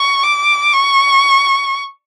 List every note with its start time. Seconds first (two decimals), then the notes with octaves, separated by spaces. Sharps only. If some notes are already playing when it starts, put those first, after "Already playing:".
Already playing: C#6
0.23 D6
0.74 C#6